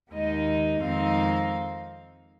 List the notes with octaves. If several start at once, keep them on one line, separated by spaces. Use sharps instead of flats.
D#2 D#3 G#3 D#4 D#5
F2 D#3 G#3 C4 D#4 F5